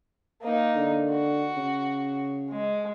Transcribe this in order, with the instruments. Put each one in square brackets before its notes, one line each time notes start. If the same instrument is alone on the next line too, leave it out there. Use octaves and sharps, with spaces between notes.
[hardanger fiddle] A#3 D#4
[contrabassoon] D3
[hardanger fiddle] F#4
[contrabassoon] C#3
[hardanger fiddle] G#3